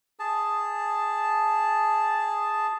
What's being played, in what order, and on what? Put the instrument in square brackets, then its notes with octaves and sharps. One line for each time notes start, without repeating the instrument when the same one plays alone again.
[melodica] G#4 A5